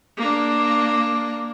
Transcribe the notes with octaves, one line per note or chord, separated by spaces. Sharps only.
A#3 D4